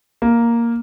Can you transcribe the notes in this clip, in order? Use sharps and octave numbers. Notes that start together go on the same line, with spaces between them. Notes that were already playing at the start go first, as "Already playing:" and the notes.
A#3